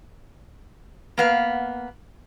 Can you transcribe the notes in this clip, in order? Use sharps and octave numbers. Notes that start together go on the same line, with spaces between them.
A#3 B3 F5